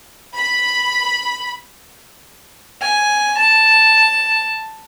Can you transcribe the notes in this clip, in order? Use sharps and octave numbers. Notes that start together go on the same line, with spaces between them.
B5
G#5
A5